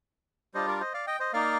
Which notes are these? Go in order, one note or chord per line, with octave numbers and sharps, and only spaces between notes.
G3 D4 F4 C5 D#5
A#4 D5
C5 D#5
D5 F5
D#5 G5
C5 D#5
A#3 D#4 D5 F5